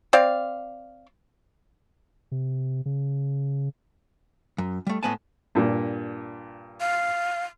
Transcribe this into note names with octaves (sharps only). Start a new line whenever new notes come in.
C4 D5 F5
C3
C#3
F#2
G3 A3
A2 G#3 B3 G#5 A5
G2 A#2
F5